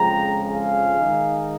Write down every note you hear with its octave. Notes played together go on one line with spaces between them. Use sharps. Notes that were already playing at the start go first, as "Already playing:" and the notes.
Already playing: F2 C#3 F3 G#3 G5 A#5
F5 G#5
D#3 G#3 D#4